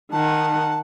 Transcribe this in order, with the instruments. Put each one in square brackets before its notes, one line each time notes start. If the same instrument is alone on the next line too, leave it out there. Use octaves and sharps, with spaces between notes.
[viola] D#3 F#5 [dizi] A5